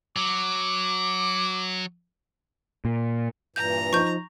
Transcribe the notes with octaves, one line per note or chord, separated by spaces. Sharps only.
F#3 D6
A#2
G2 A#2 E3 A#5 G6
F3 D#4 C#6 G6